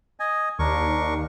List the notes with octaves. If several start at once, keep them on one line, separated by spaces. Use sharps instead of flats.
D#5 G#5
D#2 D4 A#4 C#6